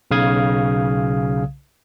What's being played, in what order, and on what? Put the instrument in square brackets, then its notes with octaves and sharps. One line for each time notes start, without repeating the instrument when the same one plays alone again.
[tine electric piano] B1 C#3 F5 D#6 G#6